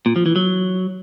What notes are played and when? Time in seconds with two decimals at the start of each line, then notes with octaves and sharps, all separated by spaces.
0.06 A#2
0.16 F3
0.26 E3
0.36 F#3